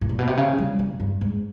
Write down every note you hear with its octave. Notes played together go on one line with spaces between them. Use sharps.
A2
A#2
B2
C3
C#3
G3
C#3
G2
G#2